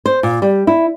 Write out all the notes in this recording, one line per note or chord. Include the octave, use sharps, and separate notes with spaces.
C5
A#2
G3
E4